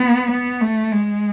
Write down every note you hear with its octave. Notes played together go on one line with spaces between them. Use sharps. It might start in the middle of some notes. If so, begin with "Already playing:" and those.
Already playing: B3
B3
A3
G#3